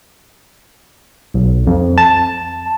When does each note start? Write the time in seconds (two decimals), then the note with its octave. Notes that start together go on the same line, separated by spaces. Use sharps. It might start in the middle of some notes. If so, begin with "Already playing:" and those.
1.34 B1
1.67 F2
1.98 A5